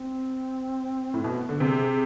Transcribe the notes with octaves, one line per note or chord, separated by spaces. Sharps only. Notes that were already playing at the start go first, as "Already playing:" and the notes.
Already playing: C4
A2
B2 B3
D3
C3 G#4